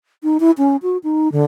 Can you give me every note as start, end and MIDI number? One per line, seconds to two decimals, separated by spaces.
0.23 0.38 63
0.40 0.51 64
0.58 0.76 61
0.82 0.97 66
1.04 1.31 63
1.32 1.45 50